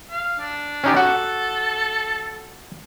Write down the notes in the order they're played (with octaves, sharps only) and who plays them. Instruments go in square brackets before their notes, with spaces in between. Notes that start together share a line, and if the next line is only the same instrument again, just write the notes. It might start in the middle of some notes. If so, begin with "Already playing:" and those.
[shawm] F5
D4
[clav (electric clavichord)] C#4 D#4 G4
[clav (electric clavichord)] F#4 F#5 [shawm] A4